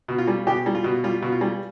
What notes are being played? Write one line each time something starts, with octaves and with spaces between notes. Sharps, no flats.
B2
F4
G3
B2 G4
G3
F4
B2
G3 F4
B2
F4
G3